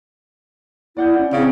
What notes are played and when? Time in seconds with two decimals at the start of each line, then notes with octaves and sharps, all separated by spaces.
0.97 E4 D5 F#5 G6
1.18 C#4
1.33 C#3 C4 D7